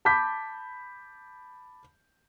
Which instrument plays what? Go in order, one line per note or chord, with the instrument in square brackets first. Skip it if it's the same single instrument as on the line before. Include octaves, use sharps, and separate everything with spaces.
[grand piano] A5 B5 D6 G6 B6